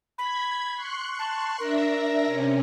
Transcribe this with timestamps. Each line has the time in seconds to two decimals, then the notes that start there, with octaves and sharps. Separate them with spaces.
0.18 B5 G#6 B6
0.74 C6 C#6 F#6
1.19 A5
1.59 D4 A#4 E5 A#6
2.25 C3 C#4